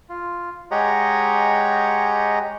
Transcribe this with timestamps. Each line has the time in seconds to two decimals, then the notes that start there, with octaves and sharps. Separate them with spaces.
0.09 F4
0.71 G#3 G4 C#5 D#5 F#5 A#5